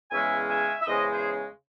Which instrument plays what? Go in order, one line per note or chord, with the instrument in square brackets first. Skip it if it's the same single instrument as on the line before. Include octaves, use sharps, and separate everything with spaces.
[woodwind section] E2 C#3 G#3 C#4 E5 G#5
E5 G#5
E5
E2 C#3 G#3 C#4 C5 D#5
G#4 C5